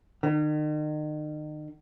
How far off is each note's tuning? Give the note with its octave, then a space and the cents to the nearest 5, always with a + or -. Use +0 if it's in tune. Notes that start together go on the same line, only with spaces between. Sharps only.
D#3 -40